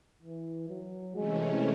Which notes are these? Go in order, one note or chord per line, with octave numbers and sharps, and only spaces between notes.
E3
F#3
C3 E3 G#3 A3 C#4